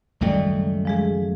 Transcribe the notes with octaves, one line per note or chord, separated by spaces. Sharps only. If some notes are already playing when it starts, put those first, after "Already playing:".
C#2 F#2 D#3 G3 A3 D5
F3 G#3 G#4